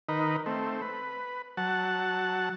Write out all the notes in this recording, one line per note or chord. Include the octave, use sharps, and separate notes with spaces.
D#3 D#4 A#4 B4
A3 C4
B4
F#3 F#5 A5